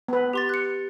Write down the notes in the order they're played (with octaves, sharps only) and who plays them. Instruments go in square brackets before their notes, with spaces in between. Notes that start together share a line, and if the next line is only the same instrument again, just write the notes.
[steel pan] B3 B4
[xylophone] G4 C6 A6
F#6 C#7